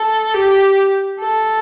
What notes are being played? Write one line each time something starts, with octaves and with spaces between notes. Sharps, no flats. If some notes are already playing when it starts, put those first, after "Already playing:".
Already playing: A4
G4
A4